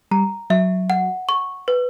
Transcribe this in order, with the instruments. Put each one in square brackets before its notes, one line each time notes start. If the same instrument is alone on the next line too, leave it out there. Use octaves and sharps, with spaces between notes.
[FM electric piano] G3 [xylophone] A#5
[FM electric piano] F#3 [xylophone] E5
[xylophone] F#5
C#6
B4